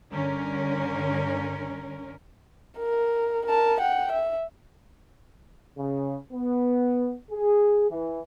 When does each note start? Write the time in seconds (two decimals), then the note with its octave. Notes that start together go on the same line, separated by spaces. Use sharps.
0.11 G2 D3 C#4 A#4
2.78 A#4
3.46 A#4 A5
3.80 F#5 G5
4.12 E5
5.78 C#3
6.31 B3
7.31 G#4
7.90 E3